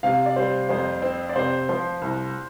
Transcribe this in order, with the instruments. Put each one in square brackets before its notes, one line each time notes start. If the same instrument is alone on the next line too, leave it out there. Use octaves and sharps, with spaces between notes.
[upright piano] C3 [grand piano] F5
[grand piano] D5
[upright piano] G3 [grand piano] C5
[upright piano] F2 [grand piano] C5
[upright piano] C4
[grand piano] D5
[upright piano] C3 [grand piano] C5
[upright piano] F3 [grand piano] C5
[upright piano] C2